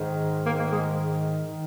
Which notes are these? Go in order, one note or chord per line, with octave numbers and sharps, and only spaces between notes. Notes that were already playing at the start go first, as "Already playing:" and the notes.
Already playing: G#2 D#3
A#3
A#3
G#3
D#3